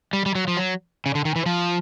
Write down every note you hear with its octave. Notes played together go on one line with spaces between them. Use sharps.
G3
G3
F#3
F3
F#3
C#3
D3
D#3
E3
F3